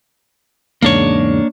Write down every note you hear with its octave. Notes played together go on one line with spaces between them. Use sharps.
E2 G#2 C#3 A#3 D4 C#5